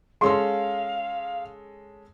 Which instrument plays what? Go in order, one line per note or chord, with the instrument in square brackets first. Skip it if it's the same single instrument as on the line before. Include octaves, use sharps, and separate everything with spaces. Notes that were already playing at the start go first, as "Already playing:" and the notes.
[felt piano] G#3 C#4 A4 [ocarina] F5 [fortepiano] C6